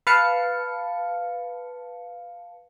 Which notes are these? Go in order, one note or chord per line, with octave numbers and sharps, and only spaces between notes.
B4 F5 A5 C#7